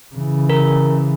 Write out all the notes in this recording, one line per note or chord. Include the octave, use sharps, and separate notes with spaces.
C#3 E3
A#4